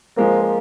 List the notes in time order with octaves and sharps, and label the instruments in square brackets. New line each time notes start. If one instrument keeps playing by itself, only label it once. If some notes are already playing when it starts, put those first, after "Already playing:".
[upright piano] F3 G#3 C4 [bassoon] A#3
[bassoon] A#3